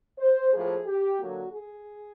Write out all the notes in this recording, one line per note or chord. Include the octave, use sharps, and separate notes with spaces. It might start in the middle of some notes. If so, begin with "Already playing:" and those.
C5
A2 F3 A#3 G#4
G4
D3 F#3 A#3 F#4
G#4